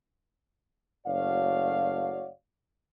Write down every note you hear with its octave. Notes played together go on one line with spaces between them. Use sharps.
F#1 A3 F#4 C#5 D5 F5